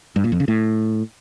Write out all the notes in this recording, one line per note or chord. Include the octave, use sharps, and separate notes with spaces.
G2
A#2
F2
C#3
A2